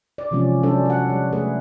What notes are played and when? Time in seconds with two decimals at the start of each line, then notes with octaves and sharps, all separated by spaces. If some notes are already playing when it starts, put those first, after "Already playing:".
0.18 D5
0.31 C3 E3 F3 G#3 C#4
0.63 F#3 C#4 D4 F#4 A4 C5
0.86 F#4 F#5
1.09 G3
1.33 A3 G#4 B4